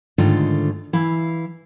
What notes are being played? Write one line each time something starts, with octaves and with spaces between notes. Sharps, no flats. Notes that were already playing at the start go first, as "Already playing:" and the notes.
G#2 D3 D#3 A3 F4
E3 E4 F5